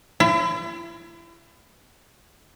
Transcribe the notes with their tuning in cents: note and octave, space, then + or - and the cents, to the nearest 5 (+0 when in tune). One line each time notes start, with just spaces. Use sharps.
E4 +40